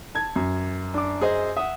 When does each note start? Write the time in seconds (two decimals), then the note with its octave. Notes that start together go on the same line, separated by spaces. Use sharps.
0.15 A5 G#6
0.36 F#2
0.94 D4 D6
1.21 G#4 C5 D#5
1.57 E5 F#5 D#6